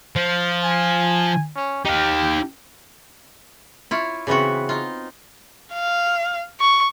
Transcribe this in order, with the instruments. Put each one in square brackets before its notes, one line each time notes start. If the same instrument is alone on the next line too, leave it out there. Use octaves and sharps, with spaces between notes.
[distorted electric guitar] F3
[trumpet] G#5
C#4
[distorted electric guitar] D#4 F5 [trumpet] G4
[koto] E4 F4 C#5
C#3 E3 B3 C4 F#4
D#4 F4
[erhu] F5
C#6